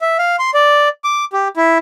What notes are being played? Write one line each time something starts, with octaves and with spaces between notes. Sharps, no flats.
E5
F5
C6
D5
D6
G4
E4